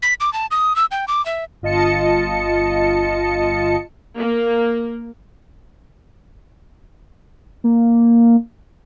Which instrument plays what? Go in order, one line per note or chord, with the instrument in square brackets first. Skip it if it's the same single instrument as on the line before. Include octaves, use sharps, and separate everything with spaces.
[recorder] B6
D6
A5
D#6
E6
G5
D6
E5
[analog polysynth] G1 F4 D#5 A5 C#7
[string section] A#3
[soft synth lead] A#3